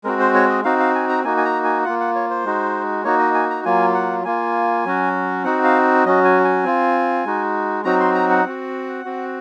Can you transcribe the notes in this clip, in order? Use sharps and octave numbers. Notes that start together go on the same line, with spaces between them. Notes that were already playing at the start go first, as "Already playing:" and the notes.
G#3 C4 F#4 A#4
C5
C#5
D#5
C4 D#4 F#4 F5
F5
G#5
A#5
A#3 D#4 F#4 G#5
G#5
A#5
G#5
A#3 F4 F#5
F#5
C#5
C5
G#3 D#4 F#4
A#3 D#4 F#4 C#5
D#5
G#5
A#5
F#3 A#3 F4 G#5
F#5
A#3 F4 G#5
F#3 C#4 F#4
C4 D#4 F#4 F#5
F5
F#3 C#4 F#4 D#5
G#5
G#5
C4 F4
G#3 D#4 F#4
F#3 C4 D#4 F#4 A#5
C6
A#5
F#5
C4 F#4
C4 F#4